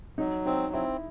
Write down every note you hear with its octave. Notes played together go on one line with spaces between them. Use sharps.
F#3 D#4
C4 D#4
C4 E4